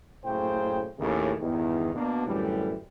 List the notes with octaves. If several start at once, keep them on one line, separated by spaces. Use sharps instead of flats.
F#1 A2 C#3 A3 C5 G5
D#2 A2 C#3
E2 G2 D#3
B2 A#3 D4
F#2 A2 D3 E3 G3